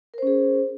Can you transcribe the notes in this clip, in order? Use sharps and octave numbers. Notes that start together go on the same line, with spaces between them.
C#4 G#4 A#4 C5